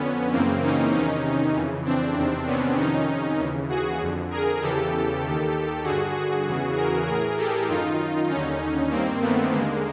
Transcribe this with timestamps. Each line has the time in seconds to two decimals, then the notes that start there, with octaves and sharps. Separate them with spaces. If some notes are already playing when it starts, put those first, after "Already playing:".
Already playing: F2 D3 B3 C#4
0.32 F#2 C#3 E3 A#3 C4
0.63 C#4 D#4
0.93 E2 C3 D#3 C#4 D#4
1.55 F2 C#3 E3
1.85 C4 D4
2.16 E2 C3 D#3
2.47 B3 C#4
2.77 F2 C3 D#3 C#4 D#4
3.39 D#2 C#3 E3
3.69 F#4 G#4
4.01 F2 D3
4.31 G#4 A#4
4.62 E2 C#3 E3 G4 A4
5.23 D#2 D#3
5.84 G2 D3 F#4 G#4
6.14 F#4 G#4
6.46 E2 C#3 E3
6.76 G#4 A#4
7.07 A2 E3 G#4 A#4
7.37 G4 A4
7.68 F#2 D#3 D#4 F4
8.29 D#2 D3 C#4 D#4
8.91 G2 D#3 A#3 C4
9.22 A3 B3
9.52 D#2 D3 G#3 A#3